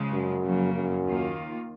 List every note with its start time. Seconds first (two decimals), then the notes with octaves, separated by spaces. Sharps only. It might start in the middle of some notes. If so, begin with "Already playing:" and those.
Already playing: C#3 F3 G#3
0.13 F#2
0.44 F2 C#3 F#3 A#3
0.74 F#2
1.04 D#2 D#3 A#3 F4